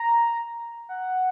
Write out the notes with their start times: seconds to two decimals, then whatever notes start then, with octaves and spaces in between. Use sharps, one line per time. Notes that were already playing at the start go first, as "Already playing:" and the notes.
Already playing: A#5
0.89 F#5